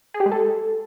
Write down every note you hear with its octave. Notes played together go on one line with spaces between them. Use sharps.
G#4
G4
G#3
A4